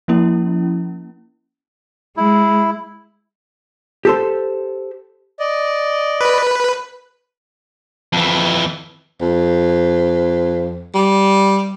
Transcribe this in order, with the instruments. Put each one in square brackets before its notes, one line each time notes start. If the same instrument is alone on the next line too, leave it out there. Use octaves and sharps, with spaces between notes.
[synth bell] F3 A#3 C#4 E4
[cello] G#3 [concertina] E4
[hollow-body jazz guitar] G4 A4 C5
[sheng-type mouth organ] D5 D#5
[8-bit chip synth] B4
[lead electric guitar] F2 E3
[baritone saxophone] F2
G3